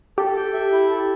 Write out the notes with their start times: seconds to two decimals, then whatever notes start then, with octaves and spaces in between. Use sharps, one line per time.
0.18 G4 A4
0.36 G5
0.53 E5
0.72 E4
0.90 A4